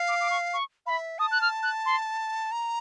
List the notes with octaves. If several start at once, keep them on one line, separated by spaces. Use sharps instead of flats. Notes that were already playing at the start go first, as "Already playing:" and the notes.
Already playing: F5
D6
D6
C#6
C#6
E5 F5 B5
A5 D#6
F#6
F6
F#6
C6
A#5